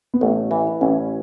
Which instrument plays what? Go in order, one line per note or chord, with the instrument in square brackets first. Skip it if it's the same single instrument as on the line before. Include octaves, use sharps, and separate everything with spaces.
[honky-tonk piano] B3
[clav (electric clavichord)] A1 [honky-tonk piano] A3
[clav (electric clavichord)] E3
[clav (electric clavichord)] A1 [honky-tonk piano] C#4